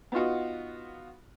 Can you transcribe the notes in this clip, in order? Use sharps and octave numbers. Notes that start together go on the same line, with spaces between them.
B3 D#4 F4 F#4